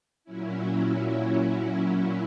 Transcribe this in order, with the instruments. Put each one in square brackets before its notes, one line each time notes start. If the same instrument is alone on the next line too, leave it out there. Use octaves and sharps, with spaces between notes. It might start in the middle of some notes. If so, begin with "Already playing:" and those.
[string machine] A#2 F#3 C#4 E4